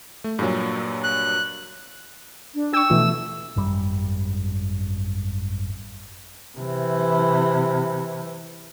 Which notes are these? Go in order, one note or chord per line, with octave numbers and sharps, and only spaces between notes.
A3
G2 A#2 F#3
F#6
D4
G5 C#6 E6
B2 E3 F3 A3
G#1 F#2 G3
C3 E3